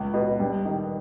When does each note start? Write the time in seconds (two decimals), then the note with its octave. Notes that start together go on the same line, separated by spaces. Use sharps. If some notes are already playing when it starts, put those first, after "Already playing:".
Already playing: C#2
0.14 B2
0.40 G2
0.65 D#3